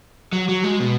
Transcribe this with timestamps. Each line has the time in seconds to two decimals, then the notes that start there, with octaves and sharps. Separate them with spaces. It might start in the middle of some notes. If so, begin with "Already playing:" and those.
0.32 F#3
0.48 F#3
0.64 G#3
0.80 B2